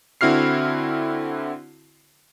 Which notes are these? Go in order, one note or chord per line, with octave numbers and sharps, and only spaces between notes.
D3 C4 E4 F#4 F6 C7